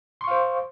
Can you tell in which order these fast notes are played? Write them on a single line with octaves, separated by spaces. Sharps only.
C6 C#6 F5 C5